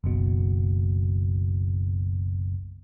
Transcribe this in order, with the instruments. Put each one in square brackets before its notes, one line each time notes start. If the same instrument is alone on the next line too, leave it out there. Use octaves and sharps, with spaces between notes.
[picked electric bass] F#1 B1 B2